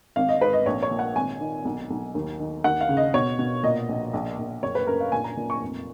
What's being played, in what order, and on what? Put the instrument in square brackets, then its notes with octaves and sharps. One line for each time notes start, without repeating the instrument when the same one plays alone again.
[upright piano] G#1 F5
D#5
G#2 B4
D#5
A#1 C#5
C#5
A#2
F#5
G#1 G#5
D#3
B1
B1
D#2
D#3
D#2 F#5
F5
C#3
D#5
B2 C#5
B2
A#2 D#5
A#1
A#1
A#1
F#1 C#5
B4
F#2 A#4
F5
A#2 G#5
A#5
A#2
C#6
F1